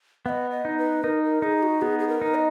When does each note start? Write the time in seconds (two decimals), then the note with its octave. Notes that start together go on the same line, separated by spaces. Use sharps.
0.25 B3 D#5 F5
0.51 D#5
0.65 D#4
0.78 B4
1.03 D#4 A#4
1.24 A#4
1.42 D#4 G#4
1.63 F#4
1.82 B3 G#4
1.99 G#4
2.08 A#4
2.21 D#4
2.35 D#5